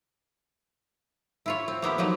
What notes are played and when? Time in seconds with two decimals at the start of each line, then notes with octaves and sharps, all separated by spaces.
1.46 E4 F4 C#5
1.68 C4
1.82 A#3 B3 E4 G4
1.98 F3 F#3 A#3 D#4